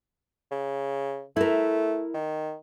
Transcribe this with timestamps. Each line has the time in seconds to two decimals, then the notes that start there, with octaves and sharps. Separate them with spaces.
0.52 C#3
1.36 A3 E4 A#4
2.14 D#3